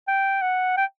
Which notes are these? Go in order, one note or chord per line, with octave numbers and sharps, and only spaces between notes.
G5
F#5
G5